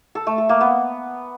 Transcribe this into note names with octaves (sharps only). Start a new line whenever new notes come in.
A4
A3
A4
A#3
B3